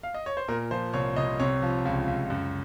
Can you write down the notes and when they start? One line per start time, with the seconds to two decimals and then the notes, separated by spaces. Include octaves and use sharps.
0.03 F5
0.14 D#5
0.26 C#5
0.37 C5
0.48 A#2 A#4
0.71 F3 C5
0.93 C2 C#5
1.16 C2 D#5
1.40 C3 C#5
1.62 F3
1.85 C#2
2.07 C#2
2.30 F#2